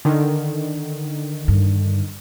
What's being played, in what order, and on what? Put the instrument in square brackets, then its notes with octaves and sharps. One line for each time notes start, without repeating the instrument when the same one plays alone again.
[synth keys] D3 D#3
[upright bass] G2